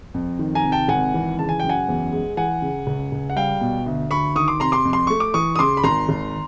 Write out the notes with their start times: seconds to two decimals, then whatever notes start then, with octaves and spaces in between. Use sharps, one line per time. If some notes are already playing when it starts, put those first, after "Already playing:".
0.14 F2
0.39 D#3
0.55 G#5 A#5
0.64 C3
0.72 G5 A5
0.88 G#1 F#5 G#5
1.14 E3
1.39 C#3 A5
1.49 G#5
1.60 F#2 G5
1.69 F#5 G#5
1.88 E2
2.12 G#3
2.37 E3 F#5 G#5
2.62 C#3
2.87 C#2
3.12 C#2
3.30 F#5
3.36 G3 F5 G5
3.61 B2
3.86 D2
4.11 D2 B5 C#6
4.36 D#3 C#6 D#6
4.48 C6 D6
4.60 C3 A#5 C6
4.72 C6 D6
4.85 F2
4.93 C6
5.07 A3 C#6
5.20 D6
5.34 E3 C#6 D#6
5.56 D#6
5.59 C#3 C6 D6
5.77 B5
5.83 G#1 A#5 C6
6.09 G#1